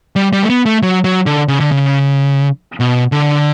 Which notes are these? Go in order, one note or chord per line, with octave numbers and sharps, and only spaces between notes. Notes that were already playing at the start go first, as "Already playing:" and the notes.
G3
G3
A3
B3
A3
F#3
F#3
D3
C#3
D3
C#3
B2
D3